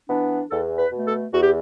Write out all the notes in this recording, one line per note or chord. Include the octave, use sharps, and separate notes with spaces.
E3 B3 D4
E2 A4
B4
B2 A3
A4
E2 F#4
G4